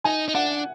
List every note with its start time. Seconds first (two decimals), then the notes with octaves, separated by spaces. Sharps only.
0.04 D#4 G#5
0.28 D#4
0.35 D4 F#5